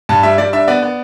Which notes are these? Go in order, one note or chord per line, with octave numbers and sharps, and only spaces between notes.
G2 A5
G3 E5
G3 D5
D4 E5
B3 D5
B3